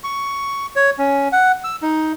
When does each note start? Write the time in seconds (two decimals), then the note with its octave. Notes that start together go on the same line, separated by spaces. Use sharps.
0.04 C#6
0.76 C#5
0.99 C#4
1.32 F#5
1.64 E6
1.82 D#4